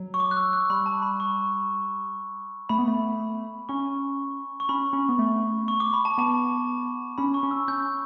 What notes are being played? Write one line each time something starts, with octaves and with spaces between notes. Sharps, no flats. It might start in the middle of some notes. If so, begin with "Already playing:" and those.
Already playing: F#3
C#6
D6
F#6
E6
F#6
G3 B5
A5
B5
C#6
A3 B5
B3
A3
C#4 C#6
C#6
C#4 B5
C#4
B3
A3
C#6
D6
B5
A5
B3 A5
C#4 B5
C#6
C#4
E6
C#4 G6